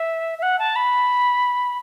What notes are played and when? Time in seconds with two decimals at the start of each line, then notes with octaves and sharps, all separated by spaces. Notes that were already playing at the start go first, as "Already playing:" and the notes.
Already playing: E5
0.38 E5
0.43 F#5
0.59 A5
0.76 B5